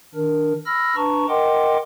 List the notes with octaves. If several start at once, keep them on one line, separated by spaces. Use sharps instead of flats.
D#3 D4 A#4
B5 E6 F6 A#6
D4 B4 A5 A#5 C#6
A#4 D#5 F#5 G5 C6 D6